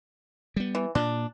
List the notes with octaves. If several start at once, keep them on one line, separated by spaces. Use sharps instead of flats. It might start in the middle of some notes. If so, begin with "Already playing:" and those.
G3 B3
E3
A#2 D4